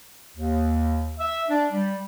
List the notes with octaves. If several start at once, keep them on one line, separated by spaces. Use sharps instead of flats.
D#2
E5
D4
G3